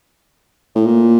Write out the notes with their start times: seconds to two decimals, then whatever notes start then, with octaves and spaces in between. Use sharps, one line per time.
0.75 A2
0.86 A#2